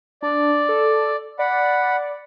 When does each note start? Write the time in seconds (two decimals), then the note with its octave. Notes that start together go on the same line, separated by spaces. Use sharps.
0.23 D4 D5
0.69 A4
1.39 D5 F#5 B5